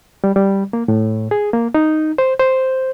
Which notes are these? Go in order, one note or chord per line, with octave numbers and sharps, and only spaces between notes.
G3
G3
A#3
A2
G#4
A#3
D#4
C5
C5